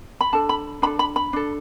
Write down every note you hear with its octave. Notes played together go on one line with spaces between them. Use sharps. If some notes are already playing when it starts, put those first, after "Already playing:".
B5
D4 A4 A5
B5
D4 A4 B5
B5
B5
D4 A4